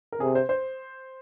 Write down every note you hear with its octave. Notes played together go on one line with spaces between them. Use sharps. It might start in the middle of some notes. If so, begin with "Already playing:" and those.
A#4
C3 G#4
C5
C5